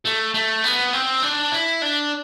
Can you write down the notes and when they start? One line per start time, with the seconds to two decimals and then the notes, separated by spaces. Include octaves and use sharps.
0.05 A3
0.34 A3
0.64 B3
0.93 C4
1.22 D4
1.52 E4
1.82 D4